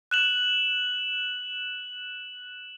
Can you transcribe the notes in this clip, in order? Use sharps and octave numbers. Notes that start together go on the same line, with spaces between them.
F#6 E7 F#7